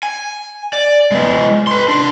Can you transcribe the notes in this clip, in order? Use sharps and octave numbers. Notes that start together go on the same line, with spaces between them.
G#5
D5
G#3 B3
B4 C6
D4 C6